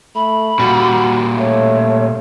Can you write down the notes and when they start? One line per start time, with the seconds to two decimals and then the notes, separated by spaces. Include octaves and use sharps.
0.15 A3 B5
0.59 A#2 G3 F#4
1.39 A3 C#5